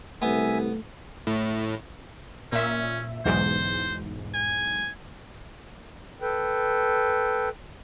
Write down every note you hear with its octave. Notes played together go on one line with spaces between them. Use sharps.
C2 A3 B3 E5 G#5
A2
A#2 C#4 E5
B1 E2 G#2 C5
G#5
A4 B4 G5